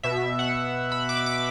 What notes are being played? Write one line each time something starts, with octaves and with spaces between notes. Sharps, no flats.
B2 E5
F#5
B5
D6
D6